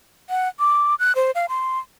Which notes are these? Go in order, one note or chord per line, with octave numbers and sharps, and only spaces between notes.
F#5
D6
F#6
C5
F5
C6